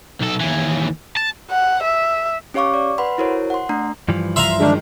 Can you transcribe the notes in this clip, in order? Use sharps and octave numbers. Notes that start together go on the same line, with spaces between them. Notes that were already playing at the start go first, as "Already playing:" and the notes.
B1 A4
D#2 E3
A5
F#5
E5
C#4 G4 C#5 F5 C#6 D6
D5
B4 F#5 B5 C6
E4 F#4 A#4 C5 C#5
F#5 C6
A3 D4 A#5
G2 E3 F3
E5 F5 A#5 C6
D#3 G#3 D4